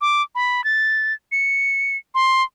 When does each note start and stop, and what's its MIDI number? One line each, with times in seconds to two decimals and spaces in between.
0.01 0.22 86
0.35 0.64 83
0.64 1.13 93
1.32 1.97 97
2.15 2.43 84